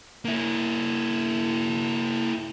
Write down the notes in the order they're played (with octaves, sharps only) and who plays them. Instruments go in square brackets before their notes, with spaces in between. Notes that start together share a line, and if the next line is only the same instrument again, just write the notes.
[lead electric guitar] A#3 E4